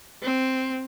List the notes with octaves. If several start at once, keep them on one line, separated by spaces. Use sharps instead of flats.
C4